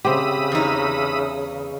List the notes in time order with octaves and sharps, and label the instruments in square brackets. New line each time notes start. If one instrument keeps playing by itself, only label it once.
[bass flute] C#3 [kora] C4 G4 [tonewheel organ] E5 B5 D#6
[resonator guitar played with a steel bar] E2 D#4